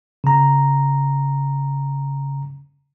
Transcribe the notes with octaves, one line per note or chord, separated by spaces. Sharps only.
C#3 A#5